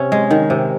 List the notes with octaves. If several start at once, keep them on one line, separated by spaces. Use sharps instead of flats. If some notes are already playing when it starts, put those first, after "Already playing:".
Already playing: C3 C#4
G#3
D#3
C3